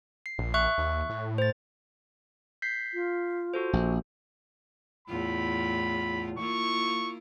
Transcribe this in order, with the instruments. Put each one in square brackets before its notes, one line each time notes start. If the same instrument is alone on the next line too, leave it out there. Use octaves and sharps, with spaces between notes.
[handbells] C7
[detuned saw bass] A#1
[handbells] E5 C#6 F#6
[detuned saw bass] D#2
A2
[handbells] C5 A6
G6 B6 C7
[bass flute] F4
[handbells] F#4 A4 C5
[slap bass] A#1
[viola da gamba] E2 A2 F4 [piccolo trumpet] B5
[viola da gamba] A#3 E4 F4 [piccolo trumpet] C#6